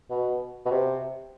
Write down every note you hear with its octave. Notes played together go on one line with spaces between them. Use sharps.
B2
B2
C3